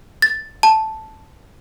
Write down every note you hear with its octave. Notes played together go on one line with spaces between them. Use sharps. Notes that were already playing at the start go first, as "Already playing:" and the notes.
A6
A5